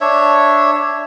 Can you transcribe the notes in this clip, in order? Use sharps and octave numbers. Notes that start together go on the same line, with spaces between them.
D4 C#5 E5